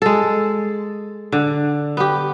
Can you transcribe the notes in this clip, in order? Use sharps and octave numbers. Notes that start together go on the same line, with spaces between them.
G#3 A4
D3
B3 G4